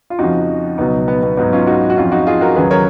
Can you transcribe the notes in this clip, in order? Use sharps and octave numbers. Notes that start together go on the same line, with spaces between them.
F4
F2 C#3 F3 D#4 F#4
C#2 B2 F#3 B3 D#4
B3
B3
G#2 F#3 B3 D#4
C#4 F4
D#4 F#4
F#4
F2 F3 C#4 F4
D#4 F#4
F4 G#4
F#4 A#4
D#2 C#3 F#3 G#4 B4
A#4 C#5